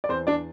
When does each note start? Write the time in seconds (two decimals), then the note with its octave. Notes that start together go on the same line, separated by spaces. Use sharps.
0.04 D5
0.09 E2 C4 C5
0.27 D4 D5